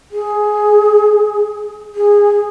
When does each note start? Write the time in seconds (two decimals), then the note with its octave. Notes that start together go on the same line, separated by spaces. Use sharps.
0.11 G#4
1.95 G#4